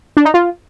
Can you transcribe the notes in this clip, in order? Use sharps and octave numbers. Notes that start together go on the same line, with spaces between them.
D4
D#4
F4